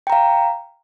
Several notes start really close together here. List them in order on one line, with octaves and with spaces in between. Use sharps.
G5 A#5 F5